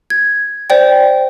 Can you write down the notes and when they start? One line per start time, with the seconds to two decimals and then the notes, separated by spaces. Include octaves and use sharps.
0.10 G#6
0.70 C5 D5 G5